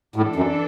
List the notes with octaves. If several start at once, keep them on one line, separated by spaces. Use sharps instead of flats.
A2 E3 D4 A4
F#2